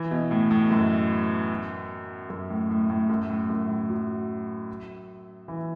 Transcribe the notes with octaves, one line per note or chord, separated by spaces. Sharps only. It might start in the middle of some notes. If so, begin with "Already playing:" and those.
Already playing: E3
B2
A2
A2
F#2
F#2
A2
A2
A2
F#2
A2
F#2
A2
F#3
E3